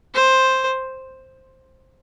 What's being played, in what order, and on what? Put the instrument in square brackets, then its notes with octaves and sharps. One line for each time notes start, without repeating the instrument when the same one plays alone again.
[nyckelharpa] C5